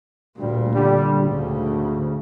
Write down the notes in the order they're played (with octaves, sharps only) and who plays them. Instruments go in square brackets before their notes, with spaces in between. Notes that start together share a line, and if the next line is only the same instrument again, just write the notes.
[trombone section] D2 G3 [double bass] A#2
[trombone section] D3 G3
[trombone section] D2 [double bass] G#2 C#3